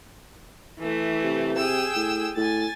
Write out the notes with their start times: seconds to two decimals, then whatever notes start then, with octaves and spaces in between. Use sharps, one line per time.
0.79 E3 A3
1.23 C3
1.56 G#4 G5 E6
1.96 A2
2.37 A2 G#5 A6